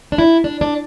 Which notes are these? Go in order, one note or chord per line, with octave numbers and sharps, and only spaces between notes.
D4
E4
D4
D4